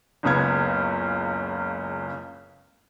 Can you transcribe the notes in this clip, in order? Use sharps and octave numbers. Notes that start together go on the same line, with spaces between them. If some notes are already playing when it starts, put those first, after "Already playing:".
F#1 C#2 C#3 B3 G#6